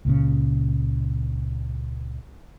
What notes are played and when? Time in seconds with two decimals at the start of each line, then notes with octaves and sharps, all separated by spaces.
0.05 C#2 A#2 C#3